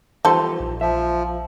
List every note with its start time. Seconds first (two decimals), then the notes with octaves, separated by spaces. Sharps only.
0.25 E3 F3 G3 B3 D#4 A4 C5
0.60 A#1
0.81 F3 E5